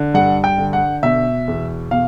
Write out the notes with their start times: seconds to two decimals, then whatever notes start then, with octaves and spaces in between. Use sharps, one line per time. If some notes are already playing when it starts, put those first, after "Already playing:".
Already playing: D3
0.14 G2 F#5
0.44 G5
0.58 D3
0.73 F#5
1.03 B2 E5
1.48 E2
1.91 B2 F5